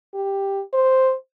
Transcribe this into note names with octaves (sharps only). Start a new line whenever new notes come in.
G4
C5